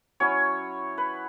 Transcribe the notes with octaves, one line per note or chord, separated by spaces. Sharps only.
F#3 C#4 E4 C#5
B4